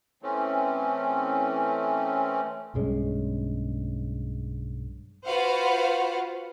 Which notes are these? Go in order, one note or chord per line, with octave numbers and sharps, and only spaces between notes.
E3 A3 C4 C#4
B1 G2 G#3 C#4
F4 F#4 B4 C5 F5 F#5